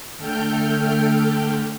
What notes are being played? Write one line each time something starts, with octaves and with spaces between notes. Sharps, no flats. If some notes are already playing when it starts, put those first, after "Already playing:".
D3 A3 A4 G5 F6 G6